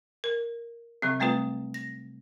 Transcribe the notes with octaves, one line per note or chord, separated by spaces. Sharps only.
A#4
C3 F#3 C4
G3 A3 C4 F4 B4
A#6